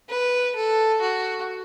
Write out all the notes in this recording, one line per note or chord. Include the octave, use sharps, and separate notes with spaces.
B4
A4
F#4